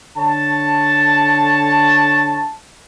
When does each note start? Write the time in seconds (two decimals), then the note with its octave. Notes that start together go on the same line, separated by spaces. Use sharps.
0.17 D3 C#5 A5